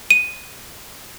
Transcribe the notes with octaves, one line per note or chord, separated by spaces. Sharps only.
D#7